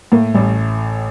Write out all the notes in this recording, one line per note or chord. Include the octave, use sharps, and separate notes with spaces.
A2 A#3
A1 G3